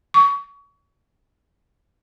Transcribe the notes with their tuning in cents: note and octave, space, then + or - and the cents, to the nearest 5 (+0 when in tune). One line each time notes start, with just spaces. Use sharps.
C#6 +30